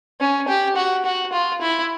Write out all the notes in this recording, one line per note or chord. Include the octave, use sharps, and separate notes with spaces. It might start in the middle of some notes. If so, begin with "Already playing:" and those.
C#4
G4
F#4
F#4
F4
E4